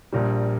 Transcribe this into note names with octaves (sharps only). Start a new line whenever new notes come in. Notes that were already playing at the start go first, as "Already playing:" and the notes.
A#1 A#2 G3